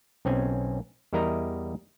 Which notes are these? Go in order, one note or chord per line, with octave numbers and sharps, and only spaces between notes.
B1 C4 C#4 G#5
E2 G3 E4 A#4 D#5 A#5